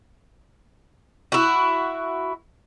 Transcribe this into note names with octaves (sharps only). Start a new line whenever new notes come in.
E4 F#4